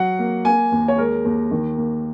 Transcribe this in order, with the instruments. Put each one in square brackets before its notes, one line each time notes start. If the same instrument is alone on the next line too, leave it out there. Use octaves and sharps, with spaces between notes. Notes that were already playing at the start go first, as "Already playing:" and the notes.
Already playing: [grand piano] F#3 F#5
A#3
A#3 G#5
D#2
C#5
G#3 A#4
D#2
D#3
A#3